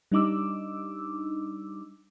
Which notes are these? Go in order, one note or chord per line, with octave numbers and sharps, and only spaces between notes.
G3 D4 D#4 D6 E6